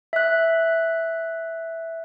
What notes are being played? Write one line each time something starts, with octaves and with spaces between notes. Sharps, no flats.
E5 F#6